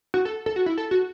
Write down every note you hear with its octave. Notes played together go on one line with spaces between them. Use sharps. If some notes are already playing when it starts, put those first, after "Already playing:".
F#4
A4
A4
F#4
E4
A4
F#4